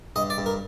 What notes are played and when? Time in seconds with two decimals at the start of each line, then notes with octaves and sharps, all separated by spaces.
0.16 G2 D#5
0.30 D5
0.38 G2
0.46 A#4